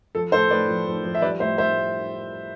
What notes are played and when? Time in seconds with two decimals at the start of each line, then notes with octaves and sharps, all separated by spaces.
0.15 F3 A4
0.32 A2 A4 C5
0.50 A2 B4 D5
0.68 F3
0.86 F3
1.04 F3
1.15 E5
1.22 G3 B4 D5
1.40 A2 C5 E5
1.58 A2 C5 E5